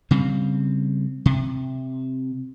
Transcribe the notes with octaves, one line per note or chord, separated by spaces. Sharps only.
C#3 G3 C4
C3